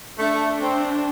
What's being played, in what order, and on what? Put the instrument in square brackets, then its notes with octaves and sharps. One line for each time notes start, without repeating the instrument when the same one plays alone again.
[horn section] A3 [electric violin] D4
[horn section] C4